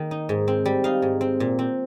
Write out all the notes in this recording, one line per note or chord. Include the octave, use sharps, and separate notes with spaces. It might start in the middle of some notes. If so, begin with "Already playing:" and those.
Already playing: D#3 A#3
D#4
G#2
C4
G3
D#4 F5
G#2
C4
A#2
C4